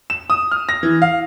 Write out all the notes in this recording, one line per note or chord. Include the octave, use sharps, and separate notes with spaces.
E7
D#6
F6
A#6
E3
F5